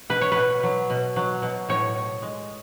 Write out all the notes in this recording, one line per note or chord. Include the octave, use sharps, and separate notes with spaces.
B2 B4
C#5
B2 B4
F#3
B2
F#3
B2
A2 C#5
A2
G#3